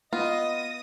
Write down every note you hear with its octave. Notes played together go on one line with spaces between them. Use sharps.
B3 F4 D#5 D#6 A#6